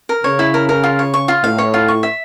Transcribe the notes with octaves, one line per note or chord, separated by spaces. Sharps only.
A#4
C#3 C#5
E4
A#4
A#4
F4
C#5
C#6
F4
A2 F5
C#5
F4
C#6
E5